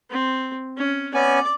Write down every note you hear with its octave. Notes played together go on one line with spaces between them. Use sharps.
C4
C#4
B3 C#4 D5 G#5 D6